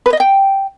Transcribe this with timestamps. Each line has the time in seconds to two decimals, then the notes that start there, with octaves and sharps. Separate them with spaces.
0.06 B4
0.13 D#5
0.20 G5